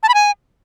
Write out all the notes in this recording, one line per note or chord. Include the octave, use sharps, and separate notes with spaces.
A5
B5
G#5